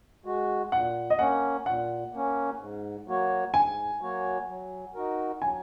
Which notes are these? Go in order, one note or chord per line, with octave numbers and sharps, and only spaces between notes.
G#3 F#4
A#2 F#5
D#5
A#3 C#4 F#5
A#2 F#5
A#3 C#4
G#2
F#3 A#3 F#4 C#5
G#2 G#5
F#3 A#3 F#4 C#5
F#3
D#4 F#4 A#4
F#3 G#5